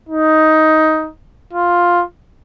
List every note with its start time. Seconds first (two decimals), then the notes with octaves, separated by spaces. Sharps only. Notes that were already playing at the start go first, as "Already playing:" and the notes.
0.09 D#4
1.53 F4